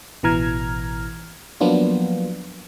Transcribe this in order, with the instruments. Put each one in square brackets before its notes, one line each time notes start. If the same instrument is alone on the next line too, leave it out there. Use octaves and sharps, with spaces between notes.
[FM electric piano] A1 B2 E3 A#5 F6 G#6
F3 F#3 A#3 B3 D4 F4